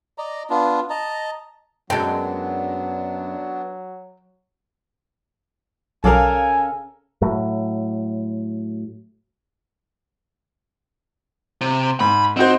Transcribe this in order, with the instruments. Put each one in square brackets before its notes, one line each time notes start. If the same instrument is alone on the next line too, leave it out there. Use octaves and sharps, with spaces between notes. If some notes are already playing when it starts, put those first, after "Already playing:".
[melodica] D5 D#5 A#5
B3 D4 F4
D#5 A5 A#5
[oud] F#2 G#3 [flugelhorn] F#3 [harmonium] B3 D4 [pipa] A4 G5
[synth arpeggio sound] B1 F#3 [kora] C#3 D5 F5 [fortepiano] A4 A#4 [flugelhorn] G#5
[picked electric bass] A2 F#3
[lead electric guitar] C3
[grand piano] G#2 [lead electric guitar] B5
[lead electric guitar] C4 [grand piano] D#4 F#4 C5